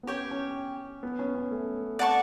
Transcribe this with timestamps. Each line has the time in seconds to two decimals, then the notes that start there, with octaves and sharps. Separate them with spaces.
0.03 B3
0.07 C#4 G4 C#5 G5
0.31 C#4
1.03 B3
1.19 C#4
1.35 C#4
1.51 A3
1.99 D5 F#5 A5 C#6